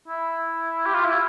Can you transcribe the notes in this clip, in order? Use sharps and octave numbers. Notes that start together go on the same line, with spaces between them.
E4
G4
F4
E4